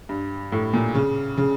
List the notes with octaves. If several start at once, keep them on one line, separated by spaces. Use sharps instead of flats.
G2
A2
A#2
C#3
C#3